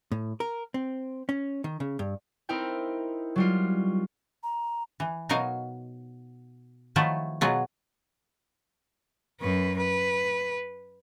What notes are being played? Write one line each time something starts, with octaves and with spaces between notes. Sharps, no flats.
A2
A#4
C4
C#4
D#3
C#3
G2
C4 D#4 E4 A#4 G5
F#3 G3 F4
A#5
E3
B2 F#3 D#4 A#4 F5
D#3 F3 F#3 A3 E4 F4
B2 F#3 F4 G#4
F#2 B4
B4